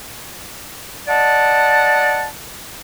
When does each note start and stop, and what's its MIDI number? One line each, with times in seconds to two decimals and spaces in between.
1.08 2.25 74
1.08 2.25 75
1.08 2.25 78
1.08 2.25 81